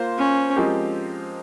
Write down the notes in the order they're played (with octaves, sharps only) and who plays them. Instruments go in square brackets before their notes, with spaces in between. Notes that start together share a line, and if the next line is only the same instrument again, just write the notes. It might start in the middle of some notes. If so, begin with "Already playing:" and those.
Already playing: [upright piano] A#3 F4 C5
[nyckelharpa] C#4
[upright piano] F3 G#3 C4 G4 A#4